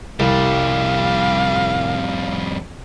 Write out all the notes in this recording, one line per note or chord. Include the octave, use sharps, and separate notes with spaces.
C2 F2 G3 F5